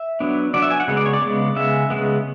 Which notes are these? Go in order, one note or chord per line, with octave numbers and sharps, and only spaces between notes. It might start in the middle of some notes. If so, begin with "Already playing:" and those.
Already playing: E5
F#3 B3 D4
F#3 B3 D4 D5
E5
G#5
F#5
C#3 G#3 B3
D5
C#5
D5
C#3 G#3 B3
C#3 G#3 B3 E5
C#3 G#3 B3